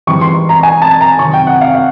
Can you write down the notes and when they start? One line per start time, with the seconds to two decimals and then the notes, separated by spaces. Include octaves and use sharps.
0.07 G#2 E3 G3 C#6
0.21 C6
0.49 A#5
0.63 G#5
0.82 A5
1.01 A#5
1.18 C3 D#3 F#3 C#6
1.34 G5
1.47 F#5
1.61 F5
1.75 F5